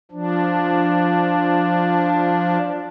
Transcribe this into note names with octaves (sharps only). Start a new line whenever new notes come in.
F3 D4